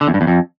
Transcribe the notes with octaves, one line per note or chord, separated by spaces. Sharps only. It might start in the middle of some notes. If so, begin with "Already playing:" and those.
D3
E2
G2
E2
F2